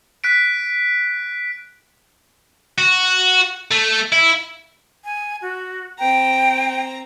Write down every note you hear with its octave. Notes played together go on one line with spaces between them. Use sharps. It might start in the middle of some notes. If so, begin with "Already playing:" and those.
F#6 B6 D7
F#4
A3
E4
G#5
F#4
C4 G5 A#5